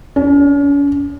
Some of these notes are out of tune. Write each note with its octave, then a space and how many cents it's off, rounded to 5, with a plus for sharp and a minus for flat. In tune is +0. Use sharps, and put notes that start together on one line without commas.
C#4 +40